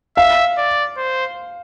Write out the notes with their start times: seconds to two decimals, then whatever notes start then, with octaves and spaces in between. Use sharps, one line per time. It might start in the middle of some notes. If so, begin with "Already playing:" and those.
0.17 E5 F5
0.58 D5
0.97 C5